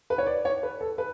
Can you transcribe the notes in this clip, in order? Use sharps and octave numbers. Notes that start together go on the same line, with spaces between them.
B4
C#5
D5
C#5
B4
A4
B4